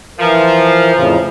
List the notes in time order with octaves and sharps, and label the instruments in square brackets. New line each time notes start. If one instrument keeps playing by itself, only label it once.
[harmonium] E3 A#4 [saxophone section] F3
[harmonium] F2 A2 C#3